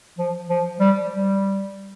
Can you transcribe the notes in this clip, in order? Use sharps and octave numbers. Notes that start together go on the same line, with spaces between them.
F3
F3
G3
G3